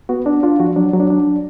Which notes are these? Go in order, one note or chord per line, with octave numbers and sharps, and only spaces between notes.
B3 F#4
D4
D4 F4
F3 F#4
F#3 D4
F#3
D4
D4
F#3